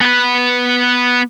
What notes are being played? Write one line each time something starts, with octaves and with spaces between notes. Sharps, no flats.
B3 B4